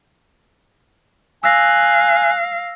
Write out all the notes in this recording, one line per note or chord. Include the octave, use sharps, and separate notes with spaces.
F5 G#5 E6 F#6 A#6